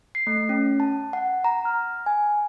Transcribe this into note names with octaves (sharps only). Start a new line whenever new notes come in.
C7
A3
C#4
A5
F#5
A#5
F6
G#5